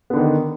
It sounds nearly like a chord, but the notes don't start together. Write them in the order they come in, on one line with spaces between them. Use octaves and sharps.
B3 D3 D#3